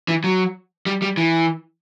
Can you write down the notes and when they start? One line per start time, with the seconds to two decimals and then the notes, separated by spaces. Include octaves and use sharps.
0.08 E3
0.24 F#3
0.86 G3
1.02 G3
1.17 E3